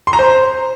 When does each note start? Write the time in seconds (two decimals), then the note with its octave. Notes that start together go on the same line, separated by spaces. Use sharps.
0.07 C6
0.13 A#5
0.19 C5